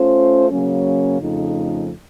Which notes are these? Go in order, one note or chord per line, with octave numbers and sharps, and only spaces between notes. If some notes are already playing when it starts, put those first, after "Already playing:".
Already playing: A3 C#4 F4 C5
C#3 F#3 A#3 C#4
F2 C#3 F3 A3 D#4